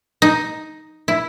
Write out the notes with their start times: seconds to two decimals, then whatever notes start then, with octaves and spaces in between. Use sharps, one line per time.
0.22 D#4
1.08 E4